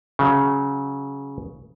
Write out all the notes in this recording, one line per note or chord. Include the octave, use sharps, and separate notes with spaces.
C#3 F#3